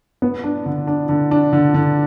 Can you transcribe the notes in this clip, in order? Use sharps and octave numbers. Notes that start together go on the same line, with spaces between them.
B3
D4
D3
D4
D3
D4
D3
D3